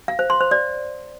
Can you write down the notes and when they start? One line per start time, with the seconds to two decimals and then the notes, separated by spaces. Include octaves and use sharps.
0.08 F5
0.19 C5
0.30 C6
0.41 C5
0.51 D5